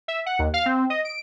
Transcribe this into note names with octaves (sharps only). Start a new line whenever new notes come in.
E5
F#5
D#2
F5
C4
D#5
D7